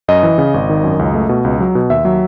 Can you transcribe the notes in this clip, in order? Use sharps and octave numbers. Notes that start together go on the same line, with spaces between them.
F#2 D#5
E3
C#3
G#1
D#3
F#2
C#2
A3
B2
C#2
F#3
B2
D#2 E5
F#3